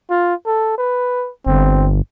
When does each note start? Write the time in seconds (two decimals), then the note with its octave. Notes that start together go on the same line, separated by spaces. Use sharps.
0.10 F4
0.46 A4
0.78 B4
1.47 G1 C4